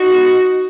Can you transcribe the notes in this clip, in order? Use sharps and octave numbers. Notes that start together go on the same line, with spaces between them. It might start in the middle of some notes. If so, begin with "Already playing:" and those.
Already playing: D#4 F#4
G#3 B3